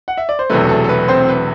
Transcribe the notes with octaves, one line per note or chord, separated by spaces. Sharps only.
F#5
E5
D5
C5
E1 E2 C3 F#3 A3 B4
A4
A4
B4
C4 C5
B4